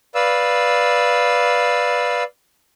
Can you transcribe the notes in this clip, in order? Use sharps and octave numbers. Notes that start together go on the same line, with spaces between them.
B4 D5 F5 E6